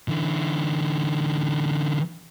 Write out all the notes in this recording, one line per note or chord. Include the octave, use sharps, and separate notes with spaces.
D3 E3